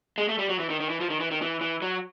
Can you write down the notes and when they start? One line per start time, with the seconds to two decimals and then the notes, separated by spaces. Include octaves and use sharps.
0.18 G#3
0.29 A3
0.38 G3
0.49 F#3
0.59 E3
0.70 D#3
0.80 D#3
0.90 E3
1.01 F3
1.10 D#3
1.20 E3
1.31 D#3
1.42 E3
1.61 E3
1.82 F#3